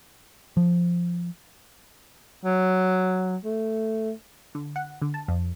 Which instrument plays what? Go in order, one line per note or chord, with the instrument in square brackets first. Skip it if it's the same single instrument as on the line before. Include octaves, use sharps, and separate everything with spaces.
[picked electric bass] F3
[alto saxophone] F#3
A3
[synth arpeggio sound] D3
F#5
D3
A5
F2